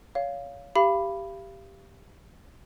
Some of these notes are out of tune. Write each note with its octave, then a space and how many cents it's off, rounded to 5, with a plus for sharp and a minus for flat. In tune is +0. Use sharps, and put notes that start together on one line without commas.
C#5 +25 F5 +0
G4 +0 F5 -35 B5 +0